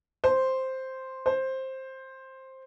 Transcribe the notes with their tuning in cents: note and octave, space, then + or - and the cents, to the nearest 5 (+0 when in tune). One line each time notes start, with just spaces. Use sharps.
C5 +0
C5 +10